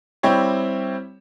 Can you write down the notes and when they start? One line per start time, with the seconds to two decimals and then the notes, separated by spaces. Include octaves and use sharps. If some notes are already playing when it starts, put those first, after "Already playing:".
0.23 G3 C4 E4 G4 C#5